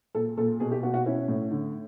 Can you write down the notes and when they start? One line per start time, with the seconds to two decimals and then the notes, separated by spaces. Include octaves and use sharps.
0.15 A#2 A4
0.37 A#2 A4
0.60 B2 G#4
0.71 G4
0.83 B2 F#4
0.94 F#4
1.06 C#4 E4
1.28 A2
1.51 D3